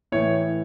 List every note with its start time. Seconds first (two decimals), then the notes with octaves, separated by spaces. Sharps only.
0.12 A2 E3 C#5